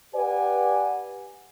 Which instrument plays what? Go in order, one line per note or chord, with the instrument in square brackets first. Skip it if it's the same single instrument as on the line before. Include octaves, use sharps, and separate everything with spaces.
[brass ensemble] G4 B4 D5 F#5 G#5